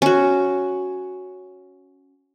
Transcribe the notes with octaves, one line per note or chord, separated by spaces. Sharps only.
C#4 F#4